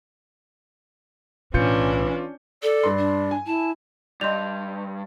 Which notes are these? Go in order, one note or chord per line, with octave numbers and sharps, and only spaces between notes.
B1 A2 E3 C#4 D4 F4 G6 C#7
A4 D5
G2 C6
D4
G#5
E4 A5
G2 D5 D#5 C6 G6 F7